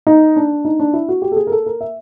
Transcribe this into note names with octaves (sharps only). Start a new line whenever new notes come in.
D#4
D4
D#4
D4
E4
F#4
G4
A4
G#4
A#4
A4
A#4
E5